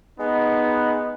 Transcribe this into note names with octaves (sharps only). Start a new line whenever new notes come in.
G#3 B3 D#4